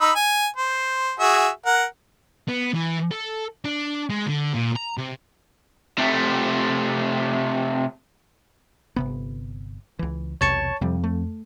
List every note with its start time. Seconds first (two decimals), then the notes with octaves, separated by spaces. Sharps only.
0.01 D#4 B5 E6
0.15 G#5
0.56 C5
1.20 F#4 G#4 E5
1.66 A#4 F#5
2.48 B3
2.74 E3
3.12 A4
3.65 D4
4.10 G#3
4.26 D3
4.54 A#2
4.76 A#5
4.97 C3
5.98 C3 A3
8.96 G1 C3 B3
9.99 C#2 E3
10.41 B1 E2 C3 C#5 A5 C#6
10.81 F2 C3 G3
11.04 A3